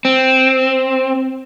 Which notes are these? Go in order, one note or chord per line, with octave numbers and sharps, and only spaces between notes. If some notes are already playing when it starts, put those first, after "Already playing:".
C4